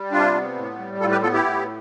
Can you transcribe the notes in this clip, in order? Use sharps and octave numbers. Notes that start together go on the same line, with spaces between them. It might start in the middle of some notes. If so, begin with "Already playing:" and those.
Already playing: G3
C3 D4 F4
B3
A2
G3
A2 F4 A4
G4 B4
B3 F4 A4
E4 G4
A2